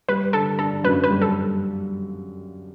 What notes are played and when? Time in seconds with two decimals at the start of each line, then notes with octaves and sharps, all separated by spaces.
0.09 G3 B4
0.33 D3 A4
0.59 D4 A4
0.84 F#2 B4
1.04 B4
1.10 G3
1.22 A4